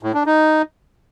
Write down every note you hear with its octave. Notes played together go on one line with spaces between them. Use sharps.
A2
D4
D#4